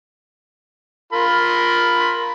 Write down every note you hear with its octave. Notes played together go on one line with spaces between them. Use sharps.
F4 A#4 B5